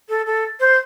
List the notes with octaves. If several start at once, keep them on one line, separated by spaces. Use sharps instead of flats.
A4
A4
C5